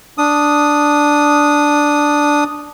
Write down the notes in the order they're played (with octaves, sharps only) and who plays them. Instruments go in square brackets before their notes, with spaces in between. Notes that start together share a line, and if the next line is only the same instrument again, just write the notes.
[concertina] D4 D#6